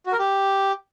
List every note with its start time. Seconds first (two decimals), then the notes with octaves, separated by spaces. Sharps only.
0.06 F#4
0.13 A#4
0.19 G4